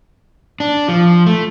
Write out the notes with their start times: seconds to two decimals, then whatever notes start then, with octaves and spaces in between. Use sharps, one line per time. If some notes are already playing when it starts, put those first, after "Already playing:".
0.60 D4
0.88 F3
1.26 A3